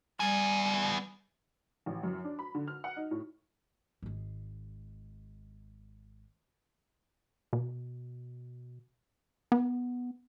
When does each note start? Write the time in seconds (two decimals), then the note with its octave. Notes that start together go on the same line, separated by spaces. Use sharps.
0.20 G3 B3 G#5
1.86 A1
2.03 F#2
2.24 D4
2.39 B5
2.55 D3
2.68 F6
2.84 F#5
2.97 D#4
3.11 A2
4.02 G#1 G#3
7.53 B2
9.52 B3